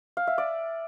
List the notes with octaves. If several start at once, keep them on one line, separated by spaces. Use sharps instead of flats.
F5
E5
D5